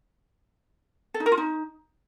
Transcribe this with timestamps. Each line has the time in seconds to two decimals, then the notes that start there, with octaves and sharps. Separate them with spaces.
1.14 A4
1.20 D#4
1.26 A#4
1.32 F4
1.38 D#4